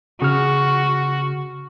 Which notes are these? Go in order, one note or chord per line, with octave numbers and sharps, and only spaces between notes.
C#3 F#4 F6